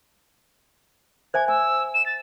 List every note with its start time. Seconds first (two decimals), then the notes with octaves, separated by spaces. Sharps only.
1.34 C5 E5 G#5 G#6
1.48 G#5 E6
1.94 E7
2.06 A6